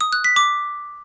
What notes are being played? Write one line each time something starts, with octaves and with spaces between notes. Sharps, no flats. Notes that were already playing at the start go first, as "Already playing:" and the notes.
D#6
F#6
B6
D6